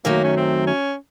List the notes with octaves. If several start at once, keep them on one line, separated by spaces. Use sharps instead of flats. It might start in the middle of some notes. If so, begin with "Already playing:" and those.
F#2 D#3 F#3 A3 A#3
C#4
C4
C#4